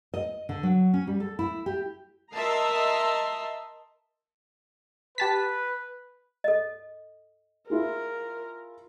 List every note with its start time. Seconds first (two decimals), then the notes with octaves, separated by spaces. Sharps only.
0.14 D#5
0.49 D3
0.63 F#3
0.94 C#4
1.07 G3
1.20 A4
1.39 E4
1.66 G4
2.35 A#4 D#5 E5 A5 A#5 C6
5.18 G4 B4 A5 B6
6.44 A4 D#5
7.70 E4 F4 G#4 A#4